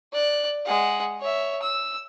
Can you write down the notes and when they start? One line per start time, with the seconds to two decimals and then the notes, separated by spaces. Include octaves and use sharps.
0.13 D5 F#6
0.66 G#3 F#5
1.21 C#5 E5
1.63 E6